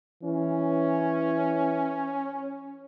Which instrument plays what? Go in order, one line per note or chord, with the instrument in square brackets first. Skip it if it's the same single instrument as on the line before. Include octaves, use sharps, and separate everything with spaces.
[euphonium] E3 [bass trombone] C#4